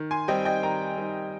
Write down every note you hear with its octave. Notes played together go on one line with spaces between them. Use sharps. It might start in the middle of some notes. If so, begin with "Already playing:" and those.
Already playing: D#3
G#5 C6
G3 C4 D#4 D#5 G5
D#5 G5
D#3 G5 A#5
G3 C4 D#4